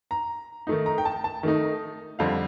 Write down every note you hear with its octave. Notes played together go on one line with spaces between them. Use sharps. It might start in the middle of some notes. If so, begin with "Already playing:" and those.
A#5
D#3 A3 D#4
A#5
G5
A5
A5
D#3 A3 D#4
F2 D3 G3 C4 F5